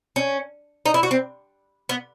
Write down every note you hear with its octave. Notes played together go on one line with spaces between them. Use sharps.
C#4
D#4
E4
F#4
C4
B3